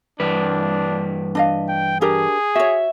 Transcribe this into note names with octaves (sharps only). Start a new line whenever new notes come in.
G2 E3 D4 B4
D4 D#5 F5
G5
D4 G4 G#4 A#4
F#4 C#5 E5